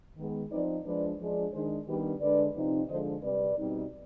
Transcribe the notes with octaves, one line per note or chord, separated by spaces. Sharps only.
D#3 G#3 B3
F3 C4 D#4 B4 D5
F3 G#3 D4 B4 D5
F3 G#3 D4
D#3 G#3 D4 G#4 C5
D#3 G3 B3 D4 G4 B4
D3 G#3 D4 B4 D5
C3 F3 C4 D#4
D3 F3 G#3 D4 C5 D#5
C3 G3 C4 B4 D5
B2 G3 C4 D#4